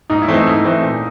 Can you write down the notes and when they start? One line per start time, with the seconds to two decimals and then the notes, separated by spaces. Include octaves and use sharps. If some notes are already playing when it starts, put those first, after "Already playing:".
0.10 G#2 D#4
0.22 E4
0.28 E3 A3 C4
0.34 D#4
0.46 G#2 E4
0.64 E3 A3 C4
0.83 A#2